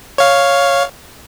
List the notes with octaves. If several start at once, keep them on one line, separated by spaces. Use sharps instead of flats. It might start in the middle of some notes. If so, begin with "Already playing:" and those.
C#5 F5